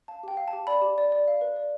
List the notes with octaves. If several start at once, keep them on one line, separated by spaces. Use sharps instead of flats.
F5 A5
G4 G5
F5
A5
G4
D5 B5
G4
D5
D5
F5
B4
D5